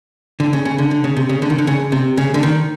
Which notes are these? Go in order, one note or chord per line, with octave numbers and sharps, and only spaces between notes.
D3
C#3
C#3
D3
D3
C#3
C3
C#3
D3
D#3
D3
C#3
C3
C#3
D3
D#3